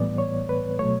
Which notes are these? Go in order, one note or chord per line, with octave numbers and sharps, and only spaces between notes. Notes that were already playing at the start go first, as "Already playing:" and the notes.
Already playing: A2 E3 G3 B3 D5
C#5
B4
B2 F#3 A3 C#5